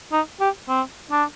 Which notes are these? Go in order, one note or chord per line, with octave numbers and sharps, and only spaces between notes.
D#4
G4
C4
D4